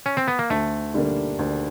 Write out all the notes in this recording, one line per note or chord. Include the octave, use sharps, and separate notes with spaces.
C#4
C4
B3
A#3
D2 A3
D3 G3 A#3 D4
D2